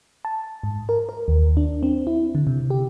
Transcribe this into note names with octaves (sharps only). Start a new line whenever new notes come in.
A5
G#2
A#4
A#4
D#2
D4
C4
E4
D3
C3
G4